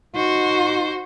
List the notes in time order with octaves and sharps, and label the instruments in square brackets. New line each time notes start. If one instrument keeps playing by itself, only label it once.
[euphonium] D#4 [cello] F#4 [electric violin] C5